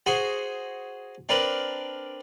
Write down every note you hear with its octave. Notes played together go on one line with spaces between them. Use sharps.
F#4 G#4 C5
C4 D4 A#4 B4